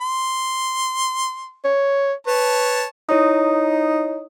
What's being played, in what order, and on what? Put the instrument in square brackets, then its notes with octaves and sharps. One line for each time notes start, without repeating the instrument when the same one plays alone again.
[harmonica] C6
[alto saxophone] C#5
[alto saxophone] B4 [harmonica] C#5 A5
[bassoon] D#4 [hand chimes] E4 C#5 D#6